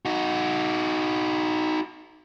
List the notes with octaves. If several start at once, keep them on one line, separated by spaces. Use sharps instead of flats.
D#4 F#4